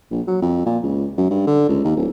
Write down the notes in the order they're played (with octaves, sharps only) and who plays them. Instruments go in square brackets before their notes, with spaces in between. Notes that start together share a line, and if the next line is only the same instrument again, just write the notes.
[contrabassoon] A#1
F#3
F2
A#2
C#2
F#2
G2
D3
C#2
D#2
D1